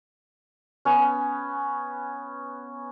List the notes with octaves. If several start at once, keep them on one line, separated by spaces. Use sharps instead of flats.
B3 C#4